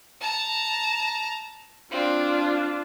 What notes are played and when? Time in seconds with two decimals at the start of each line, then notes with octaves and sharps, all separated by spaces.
0.21 A5 A#5
1.91 C4 D4 F4